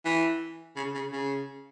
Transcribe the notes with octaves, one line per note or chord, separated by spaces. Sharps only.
E3
C#3
C#3
C#3